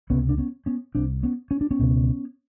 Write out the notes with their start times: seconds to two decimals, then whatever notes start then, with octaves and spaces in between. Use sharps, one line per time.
0.10 C#2 C3 B3 C#4
0.29 D4
0.38 B3 C#4
0.66 B3 C#4
0.95 C2 C3 C4 D4
1.23 B3 C#4
1.51 C#4
1.61 D4
1.71 B3 C#4
1.79 C#2 B2